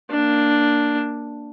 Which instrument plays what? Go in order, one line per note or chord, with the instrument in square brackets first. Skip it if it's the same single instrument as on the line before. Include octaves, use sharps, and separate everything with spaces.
[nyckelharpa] A#3 D4